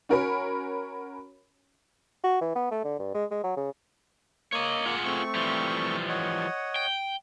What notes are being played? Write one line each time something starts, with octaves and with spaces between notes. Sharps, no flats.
C#4 F#4 A#4 C#5 G#5 B5
F#4
E3
B3
A3
D3
G2
G#3
G#3
F#3
C#3
A#3 C#5 D#5
F4 G#4 F#5
A3 C4 C#6
E3 F3 G3
C#5 D#5 F#5
G5